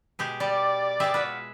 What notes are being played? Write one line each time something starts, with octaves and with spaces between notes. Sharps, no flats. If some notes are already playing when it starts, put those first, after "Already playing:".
B2 G#3 G4
G3 G4 D5
G#3 G4 B4 E5
F4 F#4 B4